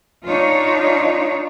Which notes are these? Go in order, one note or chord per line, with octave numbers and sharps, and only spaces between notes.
D4 D#4 F4 C#5